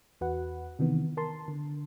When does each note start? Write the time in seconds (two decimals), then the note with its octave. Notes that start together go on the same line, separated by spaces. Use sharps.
0.21 E2 F#4 B4 F#5
0.79 C3 D#3 E3 B3
1.17 A#4 A5 C6
1.48 D3